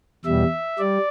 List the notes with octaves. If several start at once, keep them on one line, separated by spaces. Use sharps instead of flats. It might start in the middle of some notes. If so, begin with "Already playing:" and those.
E2 B2 G3 E5
G3 D5